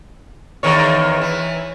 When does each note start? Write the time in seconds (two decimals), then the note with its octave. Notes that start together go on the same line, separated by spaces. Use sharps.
0.63 E2 D#3 C#5
1.21 E3